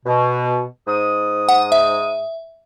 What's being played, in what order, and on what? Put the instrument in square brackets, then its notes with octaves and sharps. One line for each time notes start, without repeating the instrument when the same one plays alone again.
[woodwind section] B2
G#2 D#6
[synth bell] F#5
E5